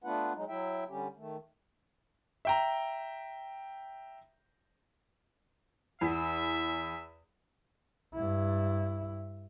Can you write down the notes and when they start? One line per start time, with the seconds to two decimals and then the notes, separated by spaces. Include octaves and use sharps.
0.04 A3 B3 D4 F4 B4 F#5
0.35 F#3 G#3 D#4
0.48 F#3 E4 E5 G5
0.89 D3 G3 C#4 G4
1.17 D#3 A3
2.45 E5 G5 A#5
6.01 E2 E5
8.15 G2 E4